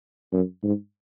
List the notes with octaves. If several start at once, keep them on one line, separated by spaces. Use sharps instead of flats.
F#2
G#2